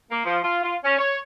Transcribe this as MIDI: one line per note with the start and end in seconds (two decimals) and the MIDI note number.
0.11 0.24 58
0.25 0.38 53
0.43 0.62 65
0.63 0.76 65
0.84 0.96 61
0.99 1.19 73